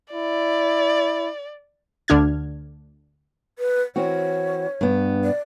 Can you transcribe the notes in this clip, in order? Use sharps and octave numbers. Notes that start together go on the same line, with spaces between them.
E4 D5
D2 D3 D4 F6 G#6
B4
E3 C4 F#4 C#5
G2 B3
D5